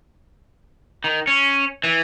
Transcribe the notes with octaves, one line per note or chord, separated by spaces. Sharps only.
D#3
C#4
E3